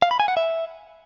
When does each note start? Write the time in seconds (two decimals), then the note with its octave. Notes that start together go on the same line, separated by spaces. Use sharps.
0.02 F5
0.11 B5
0.20 G#5
0.28 F#5
0.37 E5